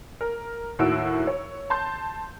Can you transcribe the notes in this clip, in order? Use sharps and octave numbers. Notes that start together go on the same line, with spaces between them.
A#4
D#2 A2 F#4 E6 D7
C#5
A5 C6 G6